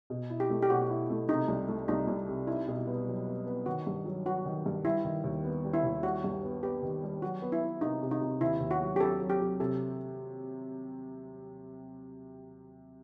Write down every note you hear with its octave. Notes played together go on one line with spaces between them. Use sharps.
B2
E4
G4
A3
G4
B2 F#4
E4
A3
C3 D#4
C2
A3
C2 D#4
C2
C3
D#4 E4
B2
B3
F#3
B3
B3
D#3 F#4
G2
F#3
F#3 F#4
D#3
G2
G3 E4
D#3
D#2
B3
G3
E4
D#2
G3 F#4
G2
B3
B3 G4
D#3
G3
F#3 F#4
B3
E4
B3
C3 D#4
C3
D#4
C3
D#2 E4
D#2
F#4
F#3
G4
F#3 A4
F#3
G4
F#3
C3 A4